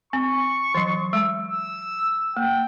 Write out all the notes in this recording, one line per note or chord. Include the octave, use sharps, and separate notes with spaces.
C4 C#6
E3 F#3
G#3
E6
A#3 G5